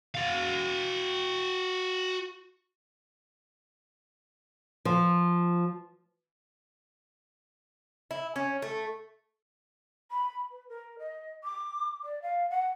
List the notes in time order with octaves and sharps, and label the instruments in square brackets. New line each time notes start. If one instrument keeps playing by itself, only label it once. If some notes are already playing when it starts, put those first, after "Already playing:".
[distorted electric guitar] F#4 F5
[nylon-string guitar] F3
[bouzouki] E4
C#4
A3
[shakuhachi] B5
B4
A#4
D#5
D6
D5
F5
F#5